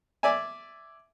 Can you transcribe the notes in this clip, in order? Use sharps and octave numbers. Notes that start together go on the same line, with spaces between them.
D5 E5 G#5